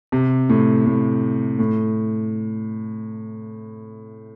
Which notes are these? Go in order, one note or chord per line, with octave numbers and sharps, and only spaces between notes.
C3
A2
A2
A2